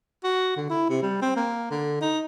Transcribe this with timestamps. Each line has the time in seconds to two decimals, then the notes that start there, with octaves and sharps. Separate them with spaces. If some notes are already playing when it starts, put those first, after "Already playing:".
0.24 F#4
0.56 D3
0.70 E4
0.90 C3
1.02 G3
1.22 C4
1.36 A#3
1.70 D3
2.01 D#4